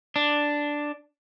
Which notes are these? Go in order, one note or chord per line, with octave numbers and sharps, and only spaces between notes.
D4